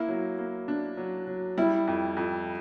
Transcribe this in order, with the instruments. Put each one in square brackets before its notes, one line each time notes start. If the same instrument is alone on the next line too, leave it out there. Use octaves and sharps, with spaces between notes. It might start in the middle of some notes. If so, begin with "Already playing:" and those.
Already playing: [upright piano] A#3 [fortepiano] E4
[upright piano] F#3
A#3
D4
F#3
F#3
[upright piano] G3 [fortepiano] E4
[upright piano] F2
F2